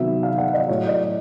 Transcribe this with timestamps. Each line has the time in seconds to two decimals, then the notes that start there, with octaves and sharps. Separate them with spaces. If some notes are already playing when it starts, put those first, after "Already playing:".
Already playing: C3 D#3 F#3 B3 E5
0.23 F5
0.38 F#5
0.54 D#5
0.68 A2 F#3 A3 C#5
0.88 D#5
0.91 D5